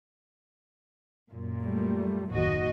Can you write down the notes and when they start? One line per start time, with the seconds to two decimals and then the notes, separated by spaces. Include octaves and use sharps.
1.30 F#2 A#2
1.60 G3 A3
2.31 F#1 D#2 A2 F#4 D#5